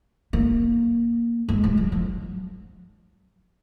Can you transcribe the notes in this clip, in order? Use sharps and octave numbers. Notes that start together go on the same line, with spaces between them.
A#3
G#3
G#3
F#3
F3